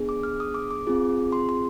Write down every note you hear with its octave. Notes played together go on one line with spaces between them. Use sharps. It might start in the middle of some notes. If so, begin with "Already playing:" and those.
Already playing: B3 D4 G#4
D6
F6
D#6
D6
D6
C4 F4 G#4
C6
C6